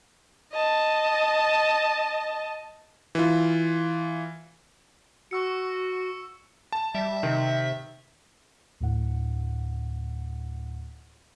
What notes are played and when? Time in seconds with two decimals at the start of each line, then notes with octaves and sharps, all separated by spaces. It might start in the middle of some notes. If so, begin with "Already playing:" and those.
0.53 D#5 A5
3.15 E3 F4
5.31 F#4 C#6 E6 C#7
6.72 A5
6.95 G3 E5
7.23 C3 D#3
8.80 D2 A2 F#5